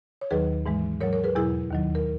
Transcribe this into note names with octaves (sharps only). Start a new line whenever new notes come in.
C#5
D#2 D#3 F#3 G#4 B4
G#2 E3 G#3
G#2 F#3 A#4 C#5
A#4 C#5
G#4 B4
E2 B2 F#3 E4 G#4
D#2 D#3 F#3
A#4